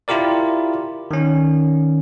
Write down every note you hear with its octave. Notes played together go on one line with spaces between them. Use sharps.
E4 F4 G4 A#4 D5
D#3 C#4